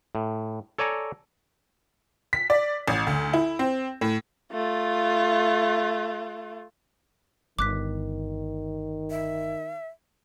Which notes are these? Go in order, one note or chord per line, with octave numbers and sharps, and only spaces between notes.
A2
A4 C#5 D5 G#5 A#5
B6
D5
A1
D2
E4
C4
A2
A3 F4
G1 D#3 D6 F#6 B6
E5